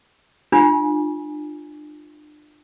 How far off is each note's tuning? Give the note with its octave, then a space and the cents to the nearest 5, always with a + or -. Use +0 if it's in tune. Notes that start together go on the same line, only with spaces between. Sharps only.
D4 +35 F4 +0 G#5 +0